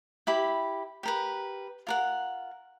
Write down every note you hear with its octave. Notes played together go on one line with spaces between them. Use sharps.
E4 G4 B5
G4 A#4 B4
F4 A#4 F#5